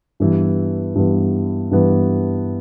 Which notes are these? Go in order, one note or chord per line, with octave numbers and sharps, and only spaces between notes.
G2 E3 B3
G2 E3 B3
G2 E3 B3